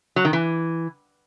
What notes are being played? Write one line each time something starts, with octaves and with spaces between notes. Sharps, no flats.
F#3
D#3
E3